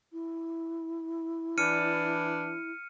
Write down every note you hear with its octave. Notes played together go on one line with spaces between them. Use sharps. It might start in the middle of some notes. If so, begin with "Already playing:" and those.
E4
E3 D4 F6 C#7 D#7